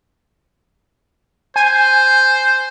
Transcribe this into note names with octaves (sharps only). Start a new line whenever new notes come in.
C5 G#5